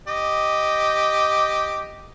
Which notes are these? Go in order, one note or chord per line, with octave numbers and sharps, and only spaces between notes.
G4 D#5